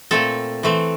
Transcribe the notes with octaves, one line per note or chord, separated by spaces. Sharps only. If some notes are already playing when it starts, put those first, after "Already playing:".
A#2 A3 C4 A4
E3 A3 C4